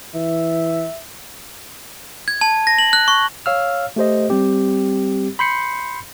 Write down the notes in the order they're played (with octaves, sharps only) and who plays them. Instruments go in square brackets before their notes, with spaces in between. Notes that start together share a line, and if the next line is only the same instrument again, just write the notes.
[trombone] E3 [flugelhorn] E5
[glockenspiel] G#6
A5
A#6
F#7
F#6
C#6
[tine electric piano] C#5 F5 E6 F6
A3 G4 C5 D#5
G3 C4 G4
B5 C6 G6 C7 C#7